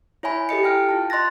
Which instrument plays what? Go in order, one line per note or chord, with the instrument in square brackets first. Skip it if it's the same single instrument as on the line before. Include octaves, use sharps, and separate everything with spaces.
[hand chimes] E4 C#5 E5 G#5 B5
G4 A4 D#5 C#7
E4 G5 F6 D7
F4 A5
D#5 C6 F#6 A6 A#6